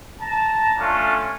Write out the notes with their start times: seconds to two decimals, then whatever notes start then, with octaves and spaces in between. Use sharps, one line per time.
0.21 A5 A#5
0.78 A3 C#4 D4 F4